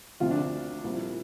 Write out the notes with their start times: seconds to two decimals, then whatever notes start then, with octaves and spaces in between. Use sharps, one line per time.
0.20 D2 C3 F3 F4
0.31 D4
0.84 C2 A#2 F3